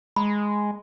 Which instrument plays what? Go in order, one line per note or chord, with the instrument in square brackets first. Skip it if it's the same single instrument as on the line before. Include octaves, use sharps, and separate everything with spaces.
[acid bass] G#3 [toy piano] B5